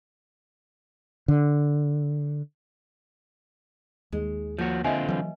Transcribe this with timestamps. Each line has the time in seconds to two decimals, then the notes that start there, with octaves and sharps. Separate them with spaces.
1.28 D3
4.12 D#2 G#3
4.58 F3 A#3 F#4
4.84 D3 C4 F4 D#5 E5 G#5
5.09 E3 F#3 B4